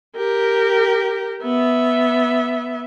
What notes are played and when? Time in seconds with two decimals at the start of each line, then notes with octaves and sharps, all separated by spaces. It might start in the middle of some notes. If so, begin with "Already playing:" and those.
0.16 G4 A#4
1.43 B3 E5